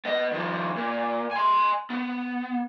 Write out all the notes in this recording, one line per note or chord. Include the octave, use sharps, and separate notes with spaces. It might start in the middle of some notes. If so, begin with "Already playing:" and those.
B3 D#5
D#3 F3
A#2
G#5 C6
B3